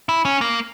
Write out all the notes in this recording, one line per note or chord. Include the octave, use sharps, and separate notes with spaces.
E4
C#4
A#3